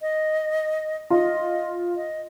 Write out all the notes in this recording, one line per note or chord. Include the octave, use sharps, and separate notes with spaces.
D#5
F4 D#5
D#5